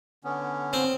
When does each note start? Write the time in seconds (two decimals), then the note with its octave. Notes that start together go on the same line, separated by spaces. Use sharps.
0.24 D3 B3 C#4
0.73 C4